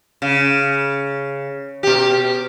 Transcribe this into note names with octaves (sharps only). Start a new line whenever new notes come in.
C#3
B2 G4